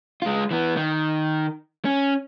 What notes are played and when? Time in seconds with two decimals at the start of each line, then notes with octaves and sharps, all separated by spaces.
0.22 G#3 F4
0.51 E3 B3
0.77 D#3
1.85 C#4